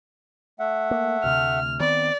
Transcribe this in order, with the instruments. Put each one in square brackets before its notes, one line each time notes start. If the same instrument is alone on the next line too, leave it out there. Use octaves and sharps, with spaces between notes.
[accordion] A3 E5 F#5
[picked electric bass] A#3
[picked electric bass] D2 C3 [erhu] F6
[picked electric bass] D#3 B3 C4 [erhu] D5